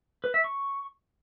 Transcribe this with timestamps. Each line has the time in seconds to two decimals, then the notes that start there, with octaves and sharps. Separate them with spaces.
0.24 B4
0.34 E5
0.44 C#6